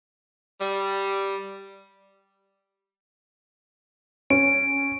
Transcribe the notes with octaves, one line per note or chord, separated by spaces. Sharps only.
G3
C#4 D7